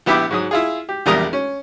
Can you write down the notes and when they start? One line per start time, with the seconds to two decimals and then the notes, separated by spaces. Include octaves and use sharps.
0.06 A#1 B3 E4 G4 B5 D6
0.31 G#2 F#3 D#6
0.51 E4 F4 G#4
0.89 G4
1.06 A#1 E2 G3 A#4 A#5 D#6
1.33 C#4